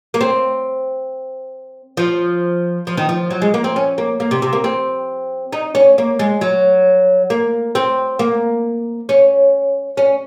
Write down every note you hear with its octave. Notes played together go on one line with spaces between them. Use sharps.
A#3
C4
F3
F3
D#3
F3
F#3
G#3
A#3
C4
C#4
A#3
A#3
C3
C3
A#3
C4
D#4
C#4
A#3
G#3
F#3
A#3
C4
A#3
C#4
C#4